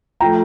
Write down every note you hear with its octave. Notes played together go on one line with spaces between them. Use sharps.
F3 A3 G5 A#5